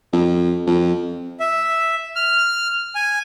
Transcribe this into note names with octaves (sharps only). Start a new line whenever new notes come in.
F2
F2
E5
F6
G#5